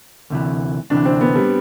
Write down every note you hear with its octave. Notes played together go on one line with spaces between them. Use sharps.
D2 C3 E3
D2 C3 E3 D4
C4
B3
G3